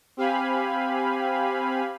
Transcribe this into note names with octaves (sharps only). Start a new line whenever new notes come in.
C4 G4 F5 G#5 B5